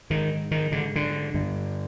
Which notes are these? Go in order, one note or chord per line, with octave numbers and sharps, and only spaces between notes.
G#2 D#3
D#3
G#2 D3
D3
G2 D3